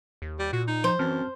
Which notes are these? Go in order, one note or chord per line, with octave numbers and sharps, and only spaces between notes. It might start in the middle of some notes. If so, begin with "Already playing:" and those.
D#2
G3
A#2 F#4
D#4
F3 C5
F#2 E3 C4 A5 F6